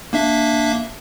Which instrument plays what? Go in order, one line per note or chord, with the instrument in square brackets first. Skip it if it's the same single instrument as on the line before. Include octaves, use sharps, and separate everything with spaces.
[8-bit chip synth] A#3 D4 E5